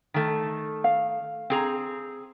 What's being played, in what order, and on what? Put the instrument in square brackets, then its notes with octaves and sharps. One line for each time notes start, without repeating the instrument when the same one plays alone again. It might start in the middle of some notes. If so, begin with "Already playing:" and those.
[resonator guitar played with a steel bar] D#3 A3
[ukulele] F5
[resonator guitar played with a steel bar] C4 G#4 A#5